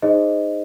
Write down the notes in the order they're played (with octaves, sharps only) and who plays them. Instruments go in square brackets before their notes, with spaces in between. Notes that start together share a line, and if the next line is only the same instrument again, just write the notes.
[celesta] D#4 G#4 C5 D#5